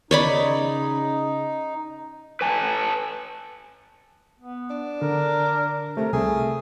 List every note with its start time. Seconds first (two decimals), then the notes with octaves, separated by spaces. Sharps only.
0.11 C#3 D#4 C#5 D5 B5
2.41 B4 G#5 A5
4.41 B3
4.70 D4
5.02 D3 A#4
5.97 C3 A3 A#4
6.13 C2 A3 G#4